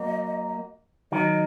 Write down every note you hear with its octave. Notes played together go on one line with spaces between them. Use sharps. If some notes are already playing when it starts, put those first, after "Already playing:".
Already playing: F#3 A#3 D#5
D#3 F#3 D#5